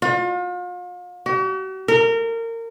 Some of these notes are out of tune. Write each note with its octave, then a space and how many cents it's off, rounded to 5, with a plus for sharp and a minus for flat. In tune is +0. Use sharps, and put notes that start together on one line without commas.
F4 +40
F#4 +45
A#4 -25